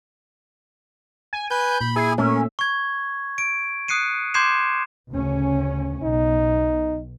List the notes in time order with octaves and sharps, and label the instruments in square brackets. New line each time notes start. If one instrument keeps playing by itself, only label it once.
[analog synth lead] G#5
[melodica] B4 G#5 [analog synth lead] G6
[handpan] A#2 [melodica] B5
[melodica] E4 G#5 [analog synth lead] G#4
[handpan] A#2 A3 E5 [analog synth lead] C#4 [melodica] A#4
[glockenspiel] C#6 G#6
D7
D#6 F#6 C7 C#7 D#7
C6 D6 G6 G#6 C7 E7
[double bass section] D2 C#3 C#4
[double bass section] B1 [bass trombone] D#4